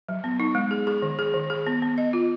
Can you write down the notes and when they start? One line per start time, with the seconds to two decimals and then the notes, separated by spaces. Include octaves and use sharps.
0.08 F#3
0.24 B3
0.40 D#4
0.55 G#3
0.71 G#4
0.87 G#4
1.02 D#3
1.19 G#4
1.34 D#3
1.50 G#4
1.67 B3
1.82 B3
1.98 D#5
2.13 F4